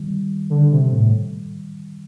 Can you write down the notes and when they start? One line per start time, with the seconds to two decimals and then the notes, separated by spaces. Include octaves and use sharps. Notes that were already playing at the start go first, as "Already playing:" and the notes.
Already playing: D#3 G3
0.50 D3
0.71 C3
0.91 A2